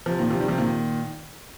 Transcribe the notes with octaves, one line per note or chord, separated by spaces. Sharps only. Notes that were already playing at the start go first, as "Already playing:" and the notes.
C3 F3
A#2 D#3
C3 F3
D#3 G3
C3 F3
A#2 D#3